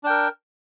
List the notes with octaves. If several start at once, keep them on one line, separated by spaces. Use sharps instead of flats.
D4 A#4 G5